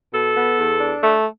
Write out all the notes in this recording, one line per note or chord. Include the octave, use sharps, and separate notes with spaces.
B2 A4
B3
E2
D4
A3